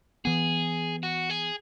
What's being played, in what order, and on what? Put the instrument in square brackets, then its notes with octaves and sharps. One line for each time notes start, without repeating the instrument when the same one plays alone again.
[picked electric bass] E3 B3 [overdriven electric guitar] G#4
[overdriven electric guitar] F#4
G#4